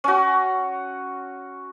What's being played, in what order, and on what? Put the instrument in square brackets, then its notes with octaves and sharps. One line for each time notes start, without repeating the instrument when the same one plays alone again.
[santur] C#4 F#4